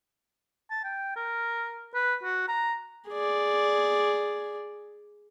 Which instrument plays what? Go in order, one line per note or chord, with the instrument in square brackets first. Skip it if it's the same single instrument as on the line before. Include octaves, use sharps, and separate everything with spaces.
[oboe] A5
G5
A#4
B4
F#4
A#5
[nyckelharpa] G#4 D5